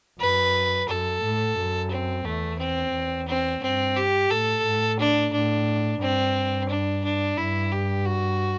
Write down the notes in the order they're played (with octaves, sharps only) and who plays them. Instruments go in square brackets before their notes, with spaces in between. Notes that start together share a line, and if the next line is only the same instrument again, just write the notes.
[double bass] F#2 [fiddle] B4
[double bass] F#2 [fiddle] A4
[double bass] A2
F#2
[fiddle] C4
[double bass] E2 [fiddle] A3
[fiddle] C4
[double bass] E2
[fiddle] C4
[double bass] G2 [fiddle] C4
[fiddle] G4
[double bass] A2 [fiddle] A4
[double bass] A2
[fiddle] D4
[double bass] A2 [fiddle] D4
[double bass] G2 [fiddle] C4
[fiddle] D4
D4
[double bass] G2 [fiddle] E4
[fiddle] G4
F#4